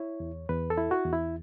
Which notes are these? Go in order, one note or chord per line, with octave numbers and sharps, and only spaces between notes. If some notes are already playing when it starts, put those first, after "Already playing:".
Already playing: E4 C#5
E2
E2 B4
A4
E4
F#4
E2
E4